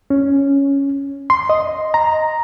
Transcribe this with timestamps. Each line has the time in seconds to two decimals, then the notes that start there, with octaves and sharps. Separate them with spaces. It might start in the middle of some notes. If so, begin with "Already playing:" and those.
0.10 C#4
1.30 C6
1.49 D#5
1.94 A#5